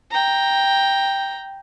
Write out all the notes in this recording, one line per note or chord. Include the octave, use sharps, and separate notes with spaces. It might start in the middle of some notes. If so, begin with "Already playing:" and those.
G5 A#5